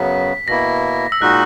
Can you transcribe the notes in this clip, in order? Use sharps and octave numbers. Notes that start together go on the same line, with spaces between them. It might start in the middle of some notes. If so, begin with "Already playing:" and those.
Already playing: F#2 C#3 F#3 B3 B6
B2 A#3 E4 A#6
E6
A#2 G#3 D#4 F#4 F#6